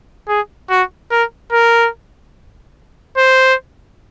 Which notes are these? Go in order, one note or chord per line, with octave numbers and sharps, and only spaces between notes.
G#4
F#4
A#4
A#4
C5